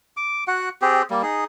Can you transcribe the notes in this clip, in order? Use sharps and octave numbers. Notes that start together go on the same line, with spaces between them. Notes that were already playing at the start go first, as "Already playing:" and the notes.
D6
F#4 F#5
C4 G4 G#4
G3 A#3
D#4 G#4